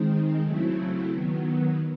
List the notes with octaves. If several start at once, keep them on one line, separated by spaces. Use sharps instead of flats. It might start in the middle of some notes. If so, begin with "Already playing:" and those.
Already playing: D#3 G#3 C4 D#4
C#3 F#3 A3 C4 E4
D#3 F#3 B3